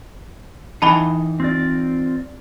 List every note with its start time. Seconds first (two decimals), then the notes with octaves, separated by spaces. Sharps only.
0.82 E3 D#4 F#5 A5 B5 G7
1.40 C4 F4 D5